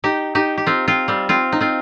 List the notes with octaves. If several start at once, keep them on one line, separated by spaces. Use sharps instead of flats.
D#4 G4
D#4 G4
G4
C4 F4
C4 F4
G3 C4
C4 F4
D#4
C4 F4